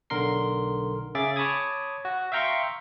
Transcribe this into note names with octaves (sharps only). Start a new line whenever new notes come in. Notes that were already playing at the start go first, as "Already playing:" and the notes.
B1 D3 A#4 C6 C7
C#3 G#4 E5 D6 A6
C#5 A5 B5 D6 D#6 G#6
F#4
E5 F5 G5 A#5 C6 C#6